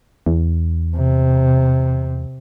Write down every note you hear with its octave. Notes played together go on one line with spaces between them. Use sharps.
E2
C3